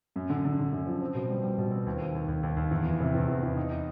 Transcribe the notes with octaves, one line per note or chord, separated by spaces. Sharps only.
F#2
D3
D3
D3
F#2
F3
C4
B2
G3
G3
B2
C4
D#2
D#2
D#2
D#2
D#2
D#2
E2
E3
C3
E2
E2
E2
D#4
D#4